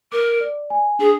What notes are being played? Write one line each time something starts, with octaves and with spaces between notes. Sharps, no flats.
A#4 D6
D5
G#5
D4 G#4